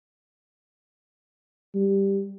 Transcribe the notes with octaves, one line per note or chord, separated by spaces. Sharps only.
G3